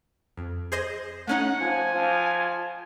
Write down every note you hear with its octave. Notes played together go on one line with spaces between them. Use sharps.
F2
G#4 C5 D#5
A3 C#4 D#4 F#5
F3 G#5
F3